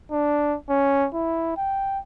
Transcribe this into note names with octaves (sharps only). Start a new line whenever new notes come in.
D4
C#4
E4
G5